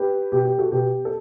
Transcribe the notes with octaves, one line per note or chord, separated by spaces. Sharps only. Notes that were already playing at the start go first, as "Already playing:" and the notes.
Already playing: G4 B4
B2 G4
G4
F#4 A4
B2 G4
A4